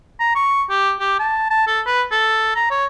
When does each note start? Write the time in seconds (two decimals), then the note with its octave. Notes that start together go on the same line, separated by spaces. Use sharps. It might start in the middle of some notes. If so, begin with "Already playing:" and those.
0.20 A#5
0.35 C#6
0.70 G4
1.00 G4
1.19 A5
1.50 A5
1.67 A4
1.86 B4
2.12 A4
2.56 A#5
2.70 C#5